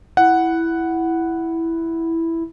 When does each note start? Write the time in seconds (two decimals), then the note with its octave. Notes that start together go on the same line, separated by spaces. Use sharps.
0.17 E4 F#5